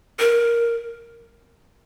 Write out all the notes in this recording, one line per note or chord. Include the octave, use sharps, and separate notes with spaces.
A#4